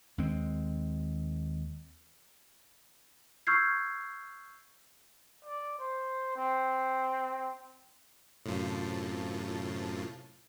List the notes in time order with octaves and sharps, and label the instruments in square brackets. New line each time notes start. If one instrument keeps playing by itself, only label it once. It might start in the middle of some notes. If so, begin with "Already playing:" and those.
[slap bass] D#2 G#3 C4
[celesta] C#6 E6 F6 G6 G#6 C7
[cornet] D5
C5
C4
[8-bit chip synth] F#2 A2 [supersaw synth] C3 F4 A5